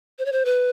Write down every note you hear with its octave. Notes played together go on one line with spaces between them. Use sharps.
C5
C#5
C5
B4